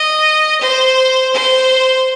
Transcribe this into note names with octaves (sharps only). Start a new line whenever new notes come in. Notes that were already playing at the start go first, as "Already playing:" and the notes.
Already playing: D#5
C5
C5